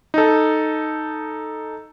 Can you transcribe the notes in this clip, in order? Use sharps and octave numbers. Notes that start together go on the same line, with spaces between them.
D#4 A4